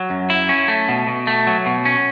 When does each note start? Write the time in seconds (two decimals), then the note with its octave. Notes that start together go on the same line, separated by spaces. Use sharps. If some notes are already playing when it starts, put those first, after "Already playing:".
Already playing: F#3
0.10 F#2
0.30 E4
0.49 C#4
0.68 A3
0.88 B2
1.07 B2
1.27 A3
1.47 F#3
1.66 B2
1.85 C#4